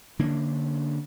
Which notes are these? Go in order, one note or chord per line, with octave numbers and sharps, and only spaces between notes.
D3 A#3 C#4 D4